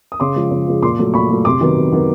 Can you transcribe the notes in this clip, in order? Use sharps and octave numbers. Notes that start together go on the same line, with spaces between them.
D#6
C#3 C6 D6
F3 G#3
C#3
F3 G#3
A#2 C6 D6
F#3 A3
A#2 B5 C#6
F#3 A3
C3 C6 D6
D#3 F#3 B3
C3
D#3 F#3 B3